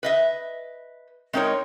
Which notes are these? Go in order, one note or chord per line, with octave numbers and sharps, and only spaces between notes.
B4 D#5 E5
G#3 C4 D#4 A#4 C#5